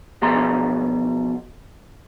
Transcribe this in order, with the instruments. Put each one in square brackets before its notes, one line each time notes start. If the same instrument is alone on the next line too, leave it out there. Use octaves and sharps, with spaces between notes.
[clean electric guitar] B1 B2 F3 G#4 A#5 C6